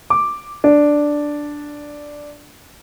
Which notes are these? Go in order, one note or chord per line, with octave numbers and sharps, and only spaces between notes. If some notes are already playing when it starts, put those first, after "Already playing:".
D6
D4